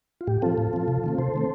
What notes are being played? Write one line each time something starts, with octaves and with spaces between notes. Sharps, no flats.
F4
A2 G4
F3 C4 F4 A4
A2
F3 C4
C3
D#3 A3 C4
C3 A4 C5
D#3 A3 C4